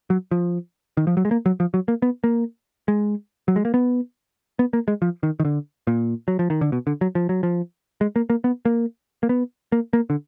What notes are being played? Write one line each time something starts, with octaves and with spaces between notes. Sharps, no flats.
F#3
F3
D#3
F3
F#3
G#3
A#3
F#3
F3
F#3
A#3
B3
A#3
G#3
F#3
G#3
A#3
B3
B3
A#3
G#3
F3
D#3
D#3
D3
A#2
F#3
F3
D#3
D3
B2
D3
F#3
F3
F#3
F3
G#3
A#3
A#3
B3
A#3
A#3
B3
A#3
A#3
D3